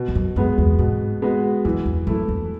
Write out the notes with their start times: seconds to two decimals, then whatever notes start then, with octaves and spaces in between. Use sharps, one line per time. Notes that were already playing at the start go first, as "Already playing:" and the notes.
Already playing: B2
0.08 E2
0.15 F#2
0.36 F#2 G#3 B3 F#4
0.58 E2
0.79 G#2 B2
1.22 G#3 B3 F#4
1.65 F#2 E3
1.86 E2
2.07 F#2 A3 E4
2.28 E2